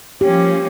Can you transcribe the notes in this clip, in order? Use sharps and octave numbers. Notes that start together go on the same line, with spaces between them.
F3 A#3 C#4 G4